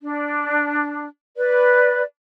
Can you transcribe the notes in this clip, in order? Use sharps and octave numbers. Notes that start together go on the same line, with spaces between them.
D4
B4 D5